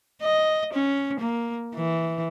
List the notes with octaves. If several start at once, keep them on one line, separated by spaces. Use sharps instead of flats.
D#5
C#4
A#3
E3